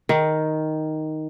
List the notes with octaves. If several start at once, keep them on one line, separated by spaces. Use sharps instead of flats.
D#3